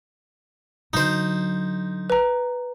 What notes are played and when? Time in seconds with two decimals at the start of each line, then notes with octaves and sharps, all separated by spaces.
0.93 D3 F#3 D#4 C5
2.10 B4 A#5